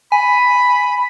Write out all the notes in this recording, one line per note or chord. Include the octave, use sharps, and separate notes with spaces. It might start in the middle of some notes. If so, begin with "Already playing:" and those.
G#5 B5